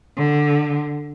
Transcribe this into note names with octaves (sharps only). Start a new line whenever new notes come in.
D3